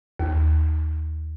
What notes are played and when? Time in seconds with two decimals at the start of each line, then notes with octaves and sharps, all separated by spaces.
0.20 D#2